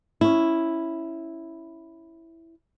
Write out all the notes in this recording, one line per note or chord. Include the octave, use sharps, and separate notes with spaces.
C#4 E4